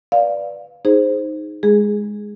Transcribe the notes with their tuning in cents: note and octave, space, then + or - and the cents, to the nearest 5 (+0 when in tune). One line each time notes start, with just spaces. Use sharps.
B4 +0 D5 +0 F5 +0
D#4 +0 G#4 +0 C5 +0
G#3 +0 G#4 +0